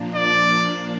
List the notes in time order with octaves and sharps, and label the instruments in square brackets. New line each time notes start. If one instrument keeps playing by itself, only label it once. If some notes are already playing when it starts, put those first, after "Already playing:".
Already playing: [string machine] A#2 F3 A#3 D4
[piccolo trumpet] D5